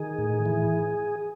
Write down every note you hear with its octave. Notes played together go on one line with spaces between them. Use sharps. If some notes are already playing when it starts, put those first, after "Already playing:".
Already playing: D#3 G#4
A2
E3